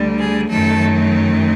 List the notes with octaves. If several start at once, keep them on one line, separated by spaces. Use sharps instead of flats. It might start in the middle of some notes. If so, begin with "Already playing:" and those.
Already playing: D2 D3 G3
G#4
F#2 D#3 F#3 A3 A4